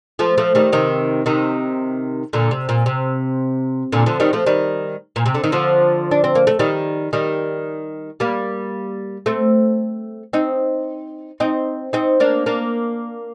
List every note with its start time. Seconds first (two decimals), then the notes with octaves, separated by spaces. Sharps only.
0.19 F3 A3
0.37 F3 A3
0.55 D#3 G3
0.72 C3 D#3
1.26 C3 D#3
2.33 A#2 D3
2.51 C3
2.69 A#2
2.86 C3
3.92 A#2 D3
4.06 D3 F3
4.20 D#3 G3
4.33 F3 A3
4.46 D#3 G3
5.16 A#2
5.26 C3
5.34 D3
5.44 D#3
5.52 D3 F3
6.11 D4
6.24 C4
6.35 A#3
6.47 A3
6.59 D#3 G3
7.13 D#3 G3
8.20 G3 A#3
9.26 A3 C4
10.33 C4 D#4
11.40 C4 D#4
11.93 C4 D#4
12.20 A#3 D4
12.46 A#3 D4